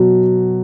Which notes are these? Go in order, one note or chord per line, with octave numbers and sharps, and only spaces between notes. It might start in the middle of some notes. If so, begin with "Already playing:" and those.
Already playing: B2 F#3